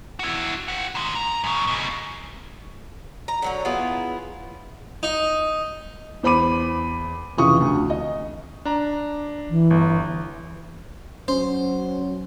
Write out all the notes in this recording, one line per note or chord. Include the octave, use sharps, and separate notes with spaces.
E4 F#4
G4 F#5
D#3 G#3
A#5
F#2 C#3
B2 G#3
A#5
D3 F#3 C#4
B3 E4 F4 G#4
D#4
E2 C5 B5 D6 D#7
F1 C#3 E3 F4 C#6 D#6
D2
D#5
D4 A#5
E3
G1
F#3 C#4 C5